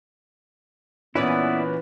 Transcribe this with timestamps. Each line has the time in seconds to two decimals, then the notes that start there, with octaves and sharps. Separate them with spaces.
1.15 A#2 E3 B3 C#4 E4 B4 D5